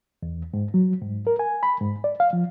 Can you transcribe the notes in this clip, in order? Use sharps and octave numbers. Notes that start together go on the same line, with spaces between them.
E2
G#2
F#3
G#2
A#4
G#5
B5
G#2
D5
F5
F3